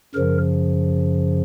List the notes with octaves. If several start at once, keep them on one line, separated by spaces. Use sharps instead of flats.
F#2 C#3 F3 A#4